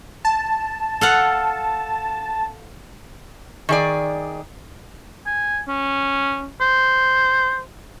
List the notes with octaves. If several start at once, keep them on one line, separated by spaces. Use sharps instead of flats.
A5
A4 F5 F#5
D#3 G#4 D5
G#5
C#4
C5